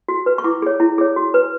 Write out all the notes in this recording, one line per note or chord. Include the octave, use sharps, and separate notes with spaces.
F#4
B4
C#6
E4 D6
G#4 C#5
E4
G#4 C#5
F#4
B4